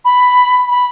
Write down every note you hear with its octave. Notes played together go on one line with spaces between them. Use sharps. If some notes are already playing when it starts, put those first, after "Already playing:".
B5
B5